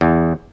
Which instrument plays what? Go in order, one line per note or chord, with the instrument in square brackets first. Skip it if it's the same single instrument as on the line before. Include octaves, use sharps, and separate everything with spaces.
[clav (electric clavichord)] E2